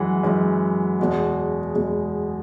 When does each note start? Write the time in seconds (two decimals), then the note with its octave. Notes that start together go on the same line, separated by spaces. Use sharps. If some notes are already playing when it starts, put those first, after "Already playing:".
Already playing: F#2 E3 G#3 F#5
0.23 F#2 E3 G#3
0.99 E2 B2 G#3
1.75 E2 B2 G#3